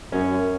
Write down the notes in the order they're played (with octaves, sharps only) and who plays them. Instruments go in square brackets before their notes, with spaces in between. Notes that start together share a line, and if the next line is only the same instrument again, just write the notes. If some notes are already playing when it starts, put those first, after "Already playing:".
[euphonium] F#2 [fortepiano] C#4